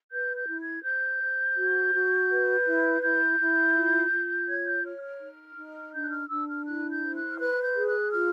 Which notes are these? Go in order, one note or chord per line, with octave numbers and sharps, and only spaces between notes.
B4 G6
G6
E4
G#6
C5 G6
C5
F#4
F#4
B4
E4
E4 G6
E4
F4
F4
C#5 G#6
G6
C#5 F6
F6
D#4
D#4
D4 G6
F#6
F6
D4 E6
F6
E4 F#6
G6
C5
F#6
F6
B4 F#6
G6
G#4
F#6
F4 F6